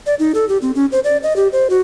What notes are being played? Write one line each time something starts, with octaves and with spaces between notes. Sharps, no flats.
D5
D#4
A4
G4
C4
C#4
C5
D5
D#5
G4
C5
F#4